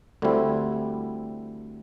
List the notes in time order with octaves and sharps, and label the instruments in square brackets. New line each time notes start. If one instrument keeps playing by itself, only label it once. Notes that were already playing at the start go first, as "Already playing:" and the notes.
[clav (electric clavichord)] D2 D3 G3 C4 E4